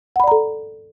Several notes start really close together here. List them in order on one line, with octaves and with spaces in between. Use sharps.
F#5 B5 D5 A#5 A4